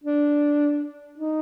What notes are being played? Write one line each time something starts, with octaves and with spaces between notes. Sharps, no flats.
D4
D#4